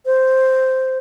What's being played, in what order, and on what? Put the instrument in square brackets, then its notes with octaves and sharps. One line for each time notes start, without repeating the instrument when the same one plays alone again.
[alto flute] C5